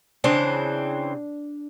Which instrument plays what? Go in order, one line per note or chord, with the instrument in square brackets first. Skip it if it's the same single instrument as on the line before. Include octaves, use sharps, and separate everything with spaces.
[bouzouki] C#3 E3 C4 [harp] D4